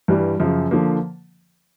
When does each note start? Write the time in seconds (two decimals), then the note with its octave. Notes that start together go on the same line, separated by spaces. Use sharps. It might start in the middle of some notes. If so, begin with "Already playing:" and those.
0.08 G2 E3 G3
0.40 F#2 C#3 F3
0.71 D3 F3 A#3